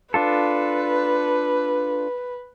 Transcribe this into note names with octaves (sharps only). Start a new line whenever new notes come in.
D4 F4 A4 B4